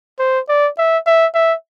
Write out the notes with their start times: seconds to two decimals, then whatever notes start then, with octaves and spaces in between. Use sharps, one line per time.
0.19 C5
0.49 D5
0.78 E5
1.06 E5
1.34 E5